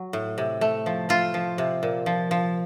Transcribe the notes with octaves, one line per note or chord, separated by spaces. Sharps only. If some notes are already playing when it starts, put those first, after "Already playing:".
Already playing: F#3
A2
C3
A3
F3
A3 F4
F3
C3
A#2
F3
F3